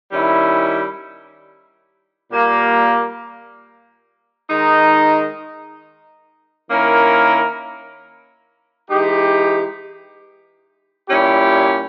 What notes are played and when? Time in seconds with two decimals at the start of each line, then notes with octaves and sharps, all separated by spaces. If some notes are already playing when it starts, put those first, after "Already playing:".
0.11 D#3 G3 C#4 E4
2.30 A#2 G3 A#3
4.50 D#3 G#3 D#4
6.70 D#3 A#3 C#4 E4 A#4
8.89 E3 G#3 D#4 G4
11.09 A#2 G3 C#4 E4 G4